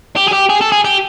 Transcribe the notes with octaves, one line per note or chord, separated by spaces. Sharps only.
G4
G#4
G4
G#4
A4
G#4
G4